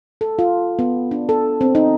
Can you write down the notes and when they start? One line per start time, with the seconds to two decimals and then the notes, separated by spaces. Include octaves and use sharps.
0.21 A4
0.39 F4
0.79 B3
1.11 D4
1.29 A4
1.61 C4
1.75 D#4